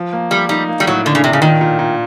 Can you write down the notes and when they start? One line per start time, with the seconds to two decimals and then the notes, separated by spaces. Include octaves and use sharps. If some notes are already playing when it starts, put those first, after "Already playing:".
Already playing: F3
0.13 A#3
0.31 F3 G3
0.49 G3 D#4
0.68 A#3
0.80 G3
0.87 A2 F#3
1.05 D3 D4
1.15 C#3
1.24 C3 D4
1.33 C#3
1.42 A#2 D#3
1.61 A#2
1.79 A#2